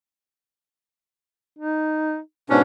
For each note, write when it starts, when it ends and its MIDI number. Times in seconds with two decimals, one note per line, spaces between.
1.59 2.18 63
2.50 2.62 44
2.50 2.62 47
2.50 2.62 61
2.50 2.60 62